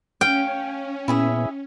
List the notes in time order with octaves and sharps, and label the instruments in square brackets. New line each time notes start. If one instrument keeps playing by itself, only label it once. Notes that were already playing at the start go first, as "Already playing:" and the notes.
[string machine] C#4 [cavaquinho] F5 [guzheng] G5
[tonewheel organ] A#2 B3 [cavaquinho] E4 G#4 E5